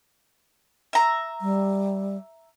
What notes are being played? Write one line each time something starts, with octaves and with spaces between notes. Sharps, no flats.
E5 A#5
G3